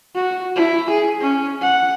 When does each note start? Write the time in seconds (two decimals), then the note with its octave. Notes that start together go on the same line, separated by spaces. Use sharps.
0.15 F#4
0.56 E4
0.90 G#4
1.20 C#4
1.62 F#5